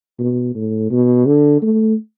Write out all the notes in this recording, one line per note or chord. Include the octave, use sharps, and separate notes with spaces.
B2
A2
B2
D3
A3